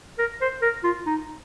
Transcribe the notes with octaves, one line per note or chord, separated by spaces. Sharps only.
A#4
C5
A#4
F4
D#4